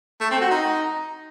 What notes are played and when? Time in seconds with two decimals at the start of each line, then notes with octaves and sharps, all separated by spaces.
0.21 A3
0.31 C4
0.41 F#4
0.51 D#4